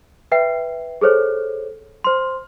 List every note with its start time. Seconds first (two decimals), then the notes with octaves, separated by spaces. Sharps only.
0.32 B4 E5 G5 C7
1.01 G#4 A4 C5 C#5
2.04 C5 C6